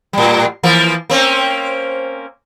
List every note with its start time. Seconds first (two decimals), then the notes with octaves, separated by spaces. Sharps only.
0.13 A2 G3
0.63 E3 F3 A#3
1.10 A#3 C4 C#4